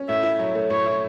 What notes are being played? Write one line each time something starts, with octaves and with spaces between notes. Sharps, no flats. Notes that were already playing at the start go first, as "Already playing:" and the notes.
Already playing: C#4
A2 E5
E4
F#3
A3
A2 C#5
E4